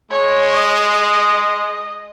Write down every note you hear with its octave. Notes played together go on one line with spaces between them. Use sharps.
G#3 C#5
D#5